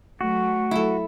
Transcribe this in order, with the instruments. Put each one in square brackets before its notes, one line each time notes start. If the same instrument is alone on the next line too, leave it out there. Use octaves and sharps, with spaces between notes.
[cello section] F#3 A3 [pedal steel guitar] F#4
[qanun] E4 A4